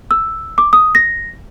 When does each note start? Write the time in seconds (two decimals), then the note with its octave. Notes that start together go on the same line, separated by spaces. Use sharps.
0.11 E6
0.58 D6
0.73 D#6
0.95 A#6